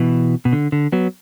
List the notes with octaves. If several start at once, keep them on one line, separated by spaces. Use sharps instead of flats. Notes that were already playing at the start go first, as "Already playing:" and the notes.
Already playing: B2 E3
B2
D3
D3
F#3 B3